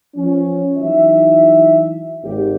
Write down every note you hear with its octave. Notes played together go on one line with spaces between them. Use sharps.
F3 C#4
E3 F#3 D#4 E5
G#1 G4